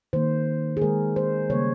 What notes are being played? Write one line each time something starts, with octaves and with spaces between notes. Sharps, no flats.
D#3 A#3 C5
G#4
D#3 G#3 A#4
C5
C#3 G3 A#3 C#5